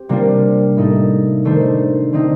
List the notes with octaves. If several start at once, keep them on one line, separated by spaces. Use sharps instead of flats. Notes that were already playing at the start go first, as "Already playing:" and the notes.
Already playing: C4 G4
C3 G3 A#3 D4 F4
A2 A3 D#4 A4
D#3 A3 D4 A4 C5
D3 A3 C4 D#4